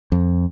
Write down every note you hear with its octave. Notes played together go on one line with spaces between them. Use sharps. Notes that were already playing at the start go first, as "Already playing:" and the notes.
F2